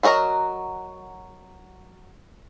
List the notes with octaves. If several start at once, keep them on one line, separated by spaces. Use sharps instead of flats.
F#3 F#4 A#4 D#5 A#5